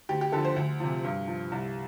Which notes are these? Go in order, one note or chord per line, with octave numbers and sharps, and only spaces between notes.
D2 G4
G4
D3 F3 A4
C5
D2
C3 F3
G2
F3
C2